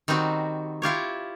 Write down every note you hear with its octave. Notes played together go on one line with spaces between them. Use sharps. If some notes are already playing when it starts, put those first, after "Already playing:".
D#3 G3 C4 D#4 F#4
E4 F4 G4 C#5